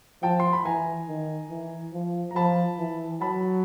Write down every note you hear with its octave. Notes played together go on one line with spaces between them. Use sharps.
F3 G5 A5
C6
B5
E3 G#5 A#5
D#3
E3
F3
A#5
F3 A5 B5
E3
F#3 A5 B5